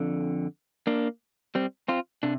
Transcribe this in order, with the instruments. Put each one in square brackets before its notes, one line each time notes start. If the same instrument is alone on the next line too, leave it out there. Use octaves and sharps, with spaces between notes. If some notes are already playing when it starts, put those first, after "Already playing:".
Already playing: [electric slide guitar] F2 D3
A#3 D4
G3 C4
C4 F4
C3 D4